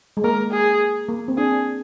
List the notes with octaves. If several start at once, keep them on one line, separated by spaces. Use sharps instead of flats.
G#3
A#3 A#4
G#4
A#3
C4
D4 G#4